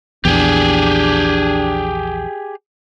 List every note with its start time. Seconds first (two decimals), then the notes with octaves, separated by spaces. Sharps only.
0.25 A#1 E2 D4 G4 G#4